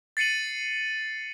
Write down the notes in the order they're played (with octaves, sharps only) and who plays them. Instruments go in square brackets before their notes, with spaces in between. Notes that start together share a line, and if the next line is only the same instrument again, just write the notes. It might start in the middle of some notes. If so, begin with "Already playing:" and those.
[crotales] A6 C7 C#7 D#7 F#7